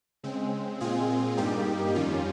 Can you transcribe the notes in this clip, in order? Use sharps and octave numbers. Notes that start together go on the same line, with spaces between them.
C#3 G#3 C4
A#2 G#3 C4 F4 G#4
G2 G3 A#3 D#4 G4
F2 D#3 G3 C#4 F4